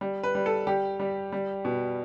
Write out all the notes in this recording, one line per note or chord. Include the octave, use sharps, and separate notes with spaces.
G3
B4
G3
A4
G3 G4
G3
G3
B2